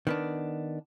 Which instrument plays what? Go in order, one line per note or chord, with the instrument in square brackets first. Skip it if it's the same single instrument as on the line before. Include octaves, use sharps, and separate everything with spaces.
[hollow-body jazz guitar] D#3 B3 D4